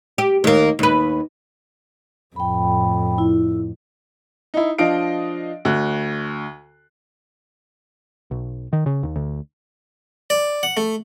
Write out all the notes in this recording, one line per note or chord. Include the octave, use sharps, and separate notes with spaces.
G4
D#2 A#3
D#2 B4
F2 A2 G5 B5
E4
D#4 E4
F3 D4 D#5 F5 D7
D2 F#6
B1
D#3
C#3
D#2
D2
D5
F#5
A3